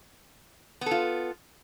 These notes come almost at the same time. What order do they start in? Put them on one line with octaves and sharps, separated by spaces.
B3 A4 F4